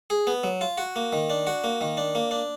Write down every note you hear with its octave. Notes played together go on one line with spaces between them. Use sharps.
G#4
B3
F#3
F4
F#4
A#3
D#3
D4
F#4
A#3
D#3
D4
A#3
D4